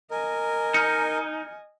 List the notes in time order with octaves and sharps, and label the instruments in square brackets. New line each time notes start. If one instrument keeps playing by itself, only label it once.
[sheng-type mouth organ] A#4 [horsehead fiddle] D#5 G#5
[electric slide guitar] D#4 [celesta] F6 G6 C#7